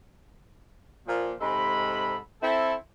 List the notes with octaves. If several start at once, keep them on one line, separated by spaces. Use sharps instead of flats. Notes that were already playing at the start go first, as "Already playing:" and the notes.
A#2 F3
G#2 C3 G#3 A4 B5
C4 E4 A4